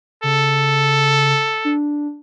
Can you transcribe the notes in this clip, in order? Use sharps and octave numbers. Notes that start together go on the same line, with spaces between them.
C#3 A4
D4